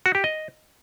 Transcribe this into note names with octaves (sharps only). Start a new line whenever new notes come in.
F#4
G4
D#5